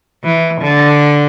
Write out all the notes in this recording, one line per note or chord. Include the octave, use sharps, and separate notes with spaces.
E3
D3